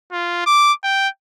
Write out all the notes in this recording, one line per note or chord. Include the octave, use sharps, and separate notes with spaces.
F4
D6
G5